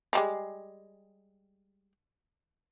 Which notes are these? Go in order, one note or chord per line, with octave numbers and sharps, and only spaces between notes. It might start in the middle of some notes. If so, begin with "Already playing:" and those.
F3 G3 G#3